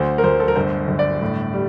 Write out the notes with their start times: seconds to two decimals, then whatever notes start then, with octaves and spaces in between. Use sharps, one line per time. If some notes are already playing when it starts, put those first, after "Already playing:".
Already playing: D2 C5
0.18 A#4
0.23 D2 C5
0.40 A4
0.48 A#4
0.56 G1 C5
0.88 G1
0.99 D5
1.21 A2
1.54 G3